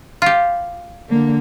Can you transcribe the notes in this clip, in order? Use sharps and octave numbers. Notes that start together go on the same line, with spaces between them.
F4 G4
D3 A#3